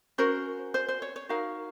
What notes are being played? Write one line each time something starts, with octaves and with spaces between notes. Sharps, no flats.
C#4 F#4 A#4 C5
C5
C5
C#5
C#5
D#4 F#4 A#4 F5